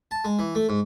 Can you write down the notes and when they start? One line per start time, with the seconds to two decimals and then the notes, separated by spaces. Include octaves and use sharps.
0.11 A5
0.24 G#3
0.39 E3
0.55 A3
0.69 G#2